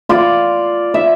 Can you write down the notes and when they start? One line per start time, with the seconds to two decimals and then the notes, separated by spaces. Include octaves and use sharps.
0.09 F4 D5
0.94 E5